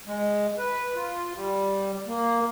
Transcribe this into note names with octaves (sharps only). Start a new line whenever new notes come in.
G#3
B4
F4
G3
A#3